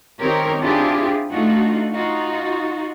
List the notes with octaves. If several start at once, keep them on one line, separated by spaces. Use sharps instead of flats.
D#3 C4 D#4 G4 A#4 C#5
C4 D4 E4 F4 G4 G#4
A3 D4 D#4 F4 F#4
D#4 F4 F#4